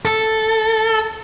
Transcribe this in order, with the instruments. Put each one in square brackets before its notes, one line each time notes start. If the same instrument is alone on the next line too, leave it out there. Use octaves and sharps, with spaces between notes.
[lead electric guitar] A4